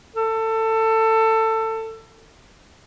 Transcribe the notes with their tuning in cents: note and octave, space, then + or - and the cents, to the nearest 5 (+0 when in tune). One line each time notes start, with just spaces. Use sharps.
A4 +20